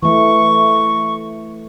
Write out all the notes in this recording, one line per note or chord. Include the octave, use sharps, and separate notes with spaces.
E3 A3 C#6